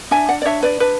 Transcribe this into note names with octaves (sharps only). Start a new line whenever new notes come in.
D4 E5 G#5
D5 F#5
D5
D4 C#5 E5
B4 D5
D4 B4